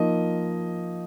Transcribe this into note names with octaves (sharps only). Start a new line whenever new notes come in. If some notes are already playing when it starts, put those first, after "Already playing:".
Already playing: F3 A#3 D#4 D#5